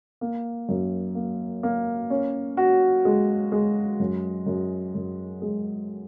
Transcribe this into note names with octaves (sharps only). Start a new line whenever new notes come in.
A#3
F#2
A#3
A#3
C#4
F#4
G#3
G#3
F#2
F#2
F#2
G#3